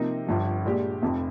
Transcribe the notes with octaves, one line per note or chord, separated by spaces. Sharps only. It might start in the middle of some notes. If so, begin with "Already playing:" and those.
Already playing: C3 F3 A#3 D#4
G1 G2 F3
A#2 G#3 D4 G4
F1 F2 C3